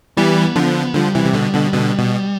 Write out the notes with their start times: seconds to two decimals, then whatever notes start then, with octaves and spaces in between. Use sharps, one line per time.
0.17 E3 G3 B3
0.56 D3 F3
0.95 D3 F3 G3
1.15 C3 E3
1.26 C3
1.34 B2 D3
1.54 B2 D3
1.73 B2 D3
1.99 B2